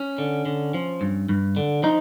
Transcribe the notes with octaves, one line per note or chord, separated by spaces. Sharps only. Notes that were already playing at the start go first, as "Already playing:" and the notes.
Already playing: C#4
D3
D3
F3
G2
G2
D3
F3 D#4